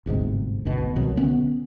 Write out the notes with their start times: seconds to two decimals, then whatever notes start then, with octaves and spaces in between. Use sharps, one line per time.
0.06 G1 D2 G#2 C3
0.65 G#1 D2 B2
0.96 C2 B2 D#3 F#3
1.16 D3 B3 C#4